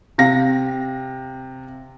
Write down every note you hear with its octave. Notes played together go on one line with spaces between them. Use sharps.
C3 F5 A#6